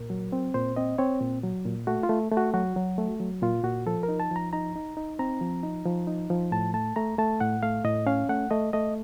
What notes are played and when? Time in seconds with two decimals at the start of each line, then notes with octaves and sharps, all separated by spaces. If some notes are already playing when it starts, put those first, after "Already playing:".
Already playing: A#2 A#4
0.10 F#3
0.32 C4
0.54 A#2 C5
0.76 C4 D#5
0.98 C4 C#5
1.20 A#2
1.43 F#3
1.65 A#2
1.87 A3 F#4
2.03 F4
2.09 A3
2.32 A3
2.37 F#4
2.54 F#3 F#4
2.76 F#3
2.98 A3
3.20 F#3
3.42 A#2 F4
3.64 A#2 F#4
3.86 F3 A4
4.03 A#4
4.09 D#4
4.20 A5
4.31 F3 A#5
4.53 D#4 A#5
4.76 D#4
4.97 D#4
5.19 C4 A#5
5.41 F3
5.63 D#4
5.85 F3
6.07 D#4
6.30 F3
6.52 A2 A5
6.74 A3 A5
6.96 A3 A#5
7.18 A3 A5
7.40 A2 F#5
7.63 A3 F5
7.85 A2 D#5
8.06 C#4 F5
8.29 A3 F#5
8.51 A3 D#5
8.73 A3 D#5